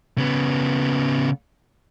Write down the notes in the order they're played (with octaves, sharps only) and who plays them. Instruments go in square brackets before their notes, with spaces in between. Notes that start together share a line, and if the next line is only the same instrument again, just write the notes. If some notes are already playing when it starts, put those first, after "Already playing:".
[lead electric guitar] C#3 B3